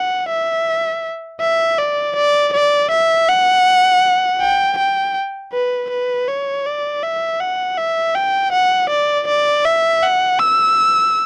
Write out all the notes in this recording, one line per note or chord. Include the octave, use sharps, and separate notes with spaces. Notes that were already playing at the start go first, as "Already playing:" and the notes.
Already playing: F#5
E5
E5
D5
D5
D5
E5
F#5
G5
G5
B4
B4
C#5
D5
E5
F#5
E5
G5
F#5
D5
D5
E5
F#5
E6